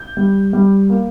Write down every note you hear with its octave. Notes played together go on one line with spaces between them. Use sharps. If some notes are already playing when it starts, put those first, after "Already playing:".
Already playing: G6
G3
G3
A#3